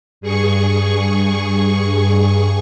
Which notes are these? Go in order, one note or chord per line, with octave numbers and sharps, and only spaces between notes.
G2 G#4 C#6